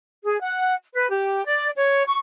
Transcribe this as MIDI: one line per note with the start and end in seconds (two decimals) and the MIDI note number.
0.24 0.40 68
0.41 0.74 78
0.94 1.09 71
1.09 1.45 67
1.46 1.69 74
1.75 2.03 73
2.07 2.18 85